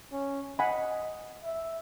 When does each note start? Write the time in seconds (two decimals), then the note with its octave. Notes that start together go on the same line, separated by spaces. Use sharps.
0.12 C#4
0.59 D#5 F#5 G#5 B5
1.44 E5